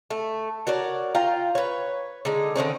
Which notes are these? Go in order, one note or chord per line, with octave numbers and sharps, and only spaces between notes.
A3
F#4 A#4 C#5 D5
F4 F5 G5 A#5
B4 C#5
D3 G#3 D#4
D3 D#3 C4 C#4